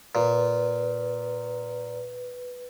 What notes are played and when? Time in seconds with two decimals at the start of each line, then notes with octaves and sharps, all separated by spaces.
0.15 A#2 B4